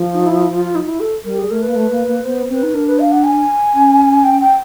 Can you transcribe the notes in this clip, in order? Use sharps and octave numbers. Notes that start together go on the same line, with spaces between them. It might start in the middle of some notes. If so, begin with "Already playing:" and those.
Already playing: F3
D#4
E4
F4
D#4
E4
A4
G3 A#4
G#4
A3 A#4
B4
A#3
A3
A#3
A#3
B3 C5
C4 B4 C5
D#4
D4 A#4
B4
F5
F#5
G#5
C#4
G5
G5